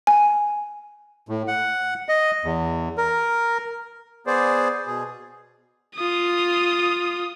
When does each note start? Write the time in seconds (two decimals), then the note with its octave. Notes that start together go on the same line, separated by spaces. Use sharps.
0.07 G#5
1.29 A2
1.48 F#5
2.09 D#5
2.45 E2
2.98 A#4
4.27 B3 G#4 C5 D5
4.87 B2 G#4
5.96 F4 D#6